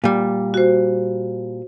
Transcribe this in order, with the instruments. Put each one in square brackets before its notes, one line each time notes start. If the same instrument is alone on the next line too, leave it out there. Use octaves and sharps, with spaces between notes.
[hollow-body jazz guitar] A#2 G3
[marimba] F#4 C5